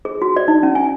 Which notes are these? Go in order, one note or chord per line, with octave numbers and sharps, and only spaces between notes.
G#4
F#4
D5
D#4
C#4
G#5